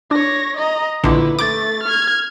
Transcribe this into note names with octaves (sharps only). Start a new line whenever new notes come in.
D4 C#5 A#6
D#5 A#5
A#1 D3 E4 B4
A3 D6 A6
F6 G#6